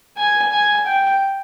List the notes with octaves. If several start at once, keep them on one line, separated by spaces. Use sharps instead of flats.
G#5
G#5
G5